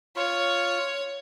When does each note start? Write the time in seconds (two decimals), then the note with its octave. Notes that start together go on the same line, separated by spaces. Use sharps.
0.16 F4 C#5 C#6